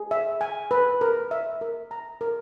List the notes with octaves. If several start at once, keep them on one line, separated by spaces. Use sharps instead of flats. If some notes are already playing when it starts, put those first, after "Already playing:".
Already playing: G#4
E5
G#5
B4
A#4
E5
A#4
A#5
A#4